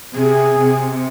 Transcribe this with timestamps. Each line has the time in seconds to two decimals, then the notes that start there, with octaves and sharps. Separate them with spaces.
0.15 C3 G#4
0.58 C3